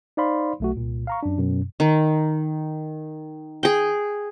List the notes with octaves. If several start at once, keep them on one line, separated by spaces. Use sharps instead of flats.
D#4 C5 D5 F5 B5 C6
B1 A3 F#4
C2 A#2
F5 A#5 C#6
F#2 D4
F#2 B2
D#3
G#4 G5